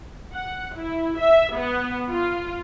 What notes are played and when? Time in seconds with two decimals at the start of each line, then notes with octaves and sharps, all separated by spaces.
0.34 F#5
0.77 E4
1.20 E5
1.57 B3
2.11 F4